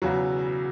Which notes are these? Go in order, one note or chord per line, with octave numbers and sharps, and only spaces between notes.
E1 E2 C#3 F#3 F#4